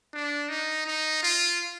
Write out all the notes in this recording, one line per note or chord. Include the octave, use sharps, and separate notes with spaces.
D4
D#4
D#4
F4